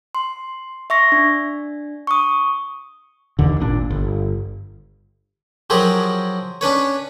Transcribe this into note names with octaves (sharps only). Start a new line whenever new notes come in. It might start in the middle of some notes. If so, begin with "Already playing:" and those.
C6
E5 C#6 A#6
D4
C#6 D#6
D#2 D3
G#1 A#2 D4
G1
F3 F#3 G4 G#4 A#4
C#4 D4 B4 C#5